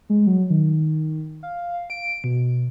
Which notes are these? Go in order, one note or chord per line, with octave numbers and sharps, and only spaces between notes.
G#3
F#3
D#3
F5
D7
B2